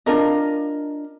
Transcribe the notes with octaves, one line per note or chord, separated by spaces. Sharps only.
D4 F4 A#4 D#5